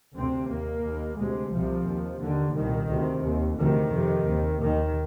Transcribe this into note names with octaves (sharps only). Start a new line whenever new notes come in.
D2 C3 C4
D#2 A#3
D#2
D2 C3 G#3
C2 C3 F3
D#2
D#2 D3
C2 A#2 D#3
D2 C3
D#2
D2 C3 D#3
F2 C3
D#2
D#2 D#3